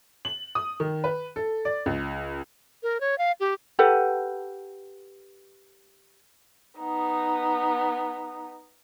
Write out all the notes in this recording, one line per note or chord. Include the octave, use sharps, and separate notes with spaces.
F#7
D#6
D#3
B4
A4
D5
C#2
A#4
C#5
F5
G4
G4 A4 B4 F#5
B3 D#4